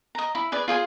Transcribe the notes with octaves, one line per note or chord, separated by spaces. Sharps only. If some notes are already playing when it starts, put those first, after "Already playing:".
D#5 A#5
E4 B5
G#4 B4 D5
F4 G#4 C5 G#5